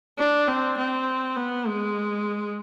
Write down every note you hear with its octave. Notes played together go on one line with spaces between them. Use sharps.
D4
C4
C4
B3
G#3